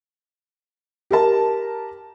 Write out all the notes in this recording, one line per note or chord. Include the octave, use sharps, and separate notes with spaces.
G4 A#4 A5